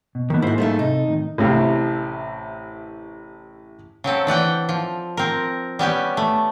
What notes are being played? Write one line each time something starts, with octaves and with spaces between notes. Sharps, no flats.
B2
D#3 A#3 B3 D#4 A4
G#2 E4 F#4 C5
G#2 C#3 A3 A4
C3 D#4
A2 D#3
A1 A2 C3 E4 F5
C#3 F#3 C4 A4
E3 D5 F#5 G5
F3
C4 A#4
G3 B3 C#4 G4
A3